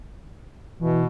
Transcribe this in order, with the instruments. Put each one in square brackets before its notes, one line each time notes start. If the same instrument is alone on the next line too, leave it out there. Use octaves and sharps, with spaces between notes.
[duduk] B2 [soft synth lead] E3